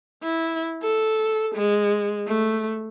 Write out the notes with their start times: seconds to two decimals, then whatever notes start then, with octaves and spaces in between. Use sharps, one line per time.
0.23 E4
0.82 A4
1.55 G#3
2.28 A3